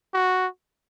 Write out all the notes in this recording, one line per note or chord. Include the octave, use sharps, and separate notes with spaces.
F#4